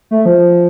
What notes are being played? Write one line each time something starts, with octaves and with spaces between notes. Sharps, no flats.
A3
F3